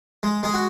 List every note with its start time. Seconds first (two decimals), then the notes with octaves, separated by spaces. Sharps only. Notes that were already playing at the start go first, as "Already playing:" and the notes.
0.23 G#3
0.43 G#3 G#4
0.54 F#4